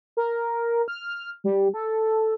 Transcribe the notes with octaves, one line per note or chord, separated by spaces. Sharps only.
A#4
F6
G3
A4